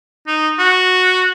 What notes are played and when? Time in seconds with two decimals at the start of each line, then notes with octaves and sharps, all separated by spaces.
0.27 D#4
0.59 F#4